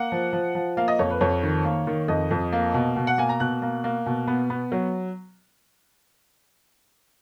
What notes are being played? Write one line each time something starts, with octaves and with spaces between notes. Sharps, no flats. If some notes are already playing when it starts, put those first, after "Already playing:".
Already playing: A#3 F#5
F3
F3
F3
A#3 F5
D#5
F2 C#5
B4
F2 C#5
D#3
A#3
D#3
F2 D#5
F2
A#3
B2
B2
F#5
A#3 G#5
A#5
B2 F#6
A#3
A#3
B2
B3
B3
F#3